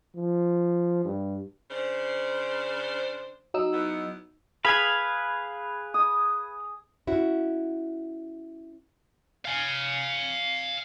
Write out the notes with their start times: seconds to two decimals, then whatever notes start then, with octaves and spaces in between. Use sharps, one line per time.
0.16 F3
1.05 G2
1.71 C#3 D4 C5
3.54 F#3 D#4 E6
3.73 E2 E3 B3
4.65 G#4 B4 F5 B5 G#6
5.94 D#6
7.07 C#4 E4 F#4
9.45 F5 G#5